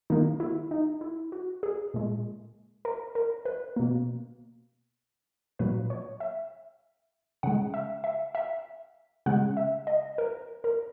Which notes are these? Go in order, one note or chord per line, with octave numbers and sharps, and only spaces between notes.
D#3 F#3 A#3 D#4
E4
D#4
E4
F#4
G#4
A#2 G#3
A#4
A#4
B4
B2 A#3
A#2 F#3 A#3 B4
C#5
E5
C#3 G#3 F#5
E5
E5
E5
C#3 G#3 F#5
E5
D#5
A#4
A#4